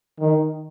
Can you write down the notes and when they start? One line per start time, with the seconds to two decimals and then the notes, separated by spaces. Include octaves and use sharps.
0.19 D#3